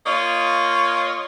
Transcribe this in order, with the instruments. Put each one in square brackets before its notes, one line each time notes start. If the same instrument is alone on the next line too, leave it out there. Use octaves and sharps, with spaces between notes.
[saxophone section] A#3 F4 C#5 D#5